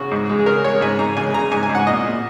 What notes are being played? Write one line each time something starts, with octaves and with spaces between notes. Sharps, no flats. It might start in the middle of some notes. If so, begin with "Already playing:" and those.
Already playing: C#3 F#4
G#2
G#3
G#4
C#3 A#4
G#3 C#5
G#2 G#5
G#2 A#5
C#3 G#5
C#3 A#5
G#2 G#5
G#5
G#2
F#5
A#2 D#5
A#2